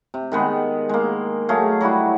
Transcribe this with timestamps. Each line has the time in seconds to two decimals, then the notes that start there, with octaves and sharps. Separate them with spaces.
0.14 C3
0.32 D#3 G#3 B3
0.89 G#3 A#3
1.49 F#3 A3 G#4 F5
1.81 F#3 G3 E4 F#4